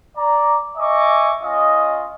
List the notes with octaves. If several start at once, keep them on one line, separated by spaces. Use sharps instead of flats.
D5 A#5
D#5 E5 G#5 C#6 D6
C#4 F4 D#5